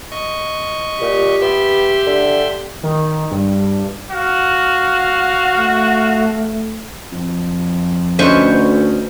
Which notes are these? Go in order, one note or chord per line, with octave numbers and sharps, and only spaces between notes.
D#5 C#6
A#2 G4
B3 E5 G5 C6
D3
D#3
G2
F#4 F5
A3 F5
F2
D2 A3 C#4 D#4 B4 C5 C#6